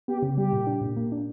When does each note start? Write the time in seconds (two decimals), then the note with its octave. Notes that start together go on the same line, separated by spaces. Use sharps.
0.08 B3 G4
0.22 C#3
0.37 G3 G4
0.53 A#2
0.67 D4
0.81 A#2
0.97 A#3
1.12 D4